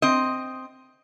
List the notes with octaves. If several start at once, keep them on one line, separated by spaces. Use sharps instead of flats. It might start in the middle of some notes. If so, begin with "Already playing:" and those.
C4 D#5